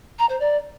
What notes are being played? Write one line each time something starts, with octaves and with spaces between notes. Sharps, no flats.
A#5
C5
D5